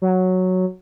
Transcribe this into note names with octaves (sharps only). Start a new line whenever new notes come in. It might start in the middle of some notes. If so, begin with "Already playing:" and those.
F#3